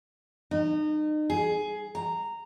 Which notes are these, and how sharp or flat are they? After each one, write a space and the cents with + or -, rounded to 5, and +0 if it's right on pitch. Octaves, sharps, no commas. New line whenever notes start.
D#4 -35
G#4 +15
A#5 -10